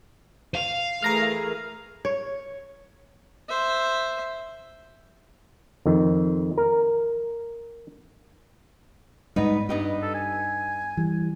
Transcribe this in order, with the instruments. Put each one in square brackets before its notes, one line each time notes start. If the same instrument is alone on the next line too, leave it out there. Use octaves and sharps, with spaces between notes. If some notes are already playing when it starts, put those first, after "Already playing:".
[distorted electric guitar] F5
[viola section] E3 A3 G#4 [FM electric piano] A#4 A#5 F6
[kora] C#5
[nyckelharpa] C5 E5
[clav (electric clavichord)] F2 D#3
A#4
[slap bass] G#2 G3 [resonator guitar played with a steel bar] B3 D#4 B4
[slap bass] G2 [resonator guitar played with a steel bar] B3 D#4 G4
[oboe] A4
G#5
[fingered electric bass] E3 G3